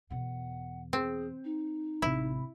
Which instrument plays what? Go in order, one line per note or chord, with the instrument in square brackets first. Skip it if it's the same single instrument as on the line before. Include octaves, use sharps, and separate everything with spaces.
[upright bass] E2 B2 [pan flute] F#5
[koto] C4 [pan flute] G#4
[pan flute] D#4
[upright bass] A1 G#3 [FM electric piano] C3 B5 [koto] E4